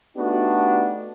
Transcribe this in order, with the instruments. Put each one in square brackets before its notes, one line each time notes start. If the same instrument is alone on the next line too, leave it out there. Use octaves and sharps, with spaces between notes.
[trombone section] A3 B3 D4 D#4 F#4 G4